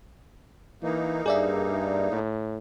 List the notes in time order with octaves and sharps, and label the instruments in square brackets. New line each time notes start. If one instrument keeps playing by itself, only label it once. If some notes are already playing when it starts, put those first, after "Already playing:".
[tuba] E3 [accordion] A#3 D#4
[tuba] G2 [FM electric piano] G#4 D5 E5
[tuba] A2